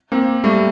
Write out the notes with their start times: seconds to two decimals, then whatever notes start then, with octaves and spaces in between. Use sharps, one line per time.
0.12 A#3 C4
0.44 G3 A3